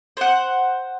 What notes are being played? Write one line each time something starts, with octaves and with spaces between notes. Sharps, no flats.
C5 F#5